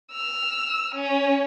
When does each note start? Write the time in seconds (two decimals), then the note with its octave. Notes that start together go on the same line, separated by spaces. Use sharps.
0.12 E6 F6
0.95 C#4